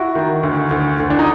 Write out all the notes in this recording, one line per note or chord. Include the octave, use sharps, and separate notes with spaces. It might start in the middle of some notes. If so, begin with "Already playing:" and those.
Already playing: E4 F#4
D#3
D2
D2
D2
D4
D#4